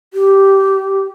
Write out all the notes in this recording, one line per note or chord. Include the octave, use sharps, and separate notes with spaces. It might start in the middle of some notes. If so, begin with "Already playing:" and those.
G4